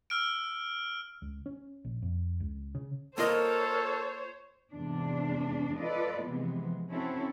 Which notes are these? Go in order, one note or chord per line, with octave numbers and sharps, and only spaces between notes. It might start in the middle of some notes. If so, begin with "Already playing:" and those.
E6 F6 D7
C#2
C#4
A#1
F2
C#2
C#3
A#3 F4 A4 A#4 C5 C#5 D#5
E2 G#2 C3 D4
F4 A4 B4 D5 D#5
C3 E3 F3 G#3 B3
C4 C#4 E4 F#4 A4 C#5